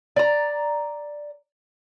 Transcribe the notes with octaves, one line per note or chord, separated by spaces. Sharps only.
D5 A#5